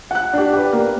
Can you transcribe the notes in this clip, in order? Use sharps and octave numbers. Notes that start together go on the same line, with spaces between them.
F#5 F#6
D4 G4
G4 B4
A#3